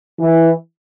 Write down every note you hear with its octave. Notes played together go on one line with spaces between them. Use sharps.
E3